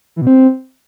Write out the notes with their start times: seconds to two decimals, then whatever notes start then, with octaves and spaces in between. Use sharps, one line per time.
0.16 E3
0.22 B2
0.27 C4